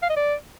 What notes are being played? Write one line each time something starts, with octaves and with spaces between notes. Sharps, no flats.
F5
D#5
D5